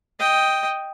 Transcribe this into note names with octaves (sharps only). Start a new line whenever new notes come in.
D#5 G5